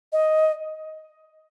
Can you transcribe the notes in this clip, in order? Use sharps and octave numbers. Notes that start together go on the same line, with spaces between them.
D#5